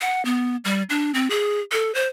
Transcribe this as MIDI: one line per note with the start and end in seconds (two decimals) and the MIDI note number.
0.01 0.24 78
0.25 0.56 59
0.65 0.83 55
0.90 1.11 62
1.14 1.28 60
1.30 1.60 68
1.72 1.94 69
1.94 2.08 72